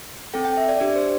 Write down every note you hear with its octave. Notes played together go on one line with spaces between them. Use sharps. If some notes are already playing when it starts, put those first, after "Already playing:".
C4 A4 G5
G5
E5
D5
D4 G4 D5
C5